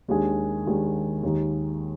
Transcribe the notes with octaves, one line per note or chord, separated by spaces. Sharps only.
D#2 D#3 G#3 D4 G#4
D#2 D#3 G#3 D4 G#4
D#2 D#3 G#3 D#4